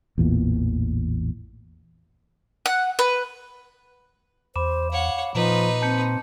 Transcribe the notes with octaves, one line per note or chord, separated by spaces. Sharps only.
A1 E2 A#2
F#5
B4
E2 C5 B5 D6 E7
C#5 F5 F#5
A#2 F3 D#4 B4
C4 A5 G6 C#7